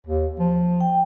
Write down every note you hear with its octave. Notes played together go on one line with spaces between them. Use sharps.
D#2
F3
G5